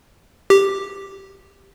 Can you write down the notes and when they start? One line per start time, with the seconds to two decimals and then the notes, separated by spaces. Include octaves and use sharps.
0.50 G4